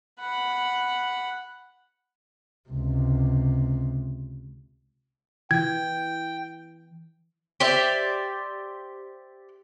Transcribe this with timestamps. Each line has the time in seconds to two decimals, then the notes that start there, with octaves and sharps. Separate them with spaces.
0.20 F#5 B5
2.69 C#2 C3
5.51 E3 G5 G#6
7.60 G4 C5 D5 E5